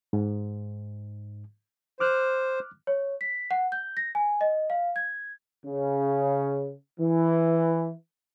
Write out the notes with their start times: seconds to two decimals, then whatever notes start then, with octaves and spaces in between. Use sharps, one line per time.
0.13 G#2
2.00 C5 D6 F6 F#6
2.87 C#5
3.21 B6
3.51 F#5
3.72 G6
3.97 A#6
4.15 G#5
4.41 D#5
4.70 F5
4.96 G#6
5.66 C#3
7.00 E3